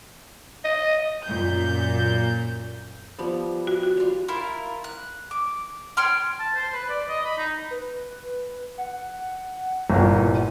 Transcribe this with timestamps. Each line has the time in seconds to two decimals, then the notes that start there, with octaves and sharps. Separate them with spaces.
0.64 D#5
1.25 F#2 A#2 G6
3.18 F3 G3 B3
3.67 F#4
3.83 F#4
3.97 G3 F4
4.28 E4 F4 A#4
4.84 F#6
5.31 D6
5.97 C#5 G5 C6 F6
6.40 A5
6.55 C5
6.74 B4
6.89 D5
7.08 D#5
7.25 B5
7.37 D#4
7.71 B4
8.78 F#5
9.90 G1 C2 A#2